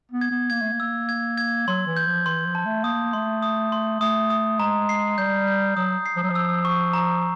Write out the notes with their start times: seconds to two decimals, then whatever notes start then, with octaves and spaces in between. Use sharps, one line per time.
0.12 B3
0.21 G#6
0.31 B3
0.50 A#3 G#6
0.62 A3
0.72 A#3
0.80 E6
1.09 G#6
1.38 G#6
1.67 F#3 C6
1.86 E3
1.97 G6
2.07 F3
2.26 E3 C6
2.46 F3
2.55 A5
2.65 A3
2.84 A#3 D#6
3.13 A3 C6
3.42 D#6
3.72 C6
4.01 A3 D#6
4.30 D#6
4.59 G#3 A#5
4.89 C7
5.18 G3 G6
5.47 G6
5.76 F#3 D#6
6.06 C7
6.16 F3
6.23 F#3
6.30 F3
6.35 E6
6.65 C#6
6.93 A#5